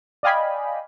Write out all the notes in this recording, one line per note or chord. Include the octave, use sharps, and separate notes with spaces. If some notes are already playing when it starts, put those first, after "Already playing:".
D5 D#5 F5 G5 G#5 B5